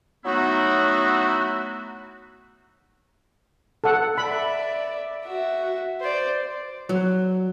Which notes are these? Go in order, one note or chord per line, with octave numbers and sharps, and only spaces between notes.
F#3 A3 B3 D#4 E4 F#4
A4 F#5
D5 E5 B5
F#4 E5
C5 D5
F#3